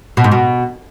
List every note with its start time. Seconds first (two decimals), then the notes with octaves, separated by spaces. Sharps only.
0.17 B2
0.24 G#2
0.32 B2